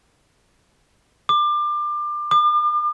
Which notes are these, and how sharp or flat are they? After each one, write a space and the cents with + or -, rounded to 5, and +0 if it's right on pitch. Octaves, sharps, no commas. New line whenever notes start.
D6 +25
D6 +40